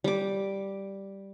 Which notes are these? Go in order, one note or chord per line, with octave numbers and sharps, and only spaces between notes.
G3 D6